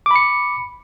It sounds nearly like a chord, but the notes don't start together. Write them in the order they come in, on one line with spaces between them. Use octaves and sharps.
D6 B5 C#7